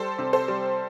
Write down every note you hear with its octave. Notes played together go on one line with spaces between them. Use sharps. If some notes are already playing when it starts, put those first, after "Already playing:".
Already playing: G3 A4 C5
C3
A4 C5
G3